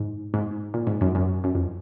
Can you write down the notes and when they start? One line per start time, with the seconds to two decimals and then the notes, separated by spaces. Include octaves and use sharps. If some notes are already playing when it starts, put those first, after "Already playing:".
Already playing: G#2
0.34 G#2
0.74 A#2
0.87 G#2
1.01 F#2
1.15 F#2
1.44 F#2
1.55 F2